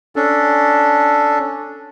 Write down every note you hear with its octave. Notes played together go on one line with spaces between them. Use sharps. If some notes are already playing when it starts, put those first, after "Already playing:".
C#4 D4 A4